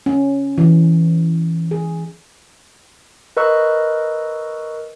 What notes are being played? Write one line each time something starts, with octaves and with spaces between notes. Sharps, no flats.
C#4
E3
G#4
A#4 B4 D#5 C#6 E6 F#6